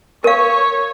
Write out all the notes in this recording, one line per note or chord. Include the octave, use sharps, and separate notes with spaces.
A#4 C#5 F5 C#6